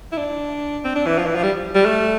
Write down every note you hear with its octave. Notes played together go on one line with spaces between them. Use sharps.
E4
D4
C4
D4
E3
F3
E3
F3
G3
G3
A3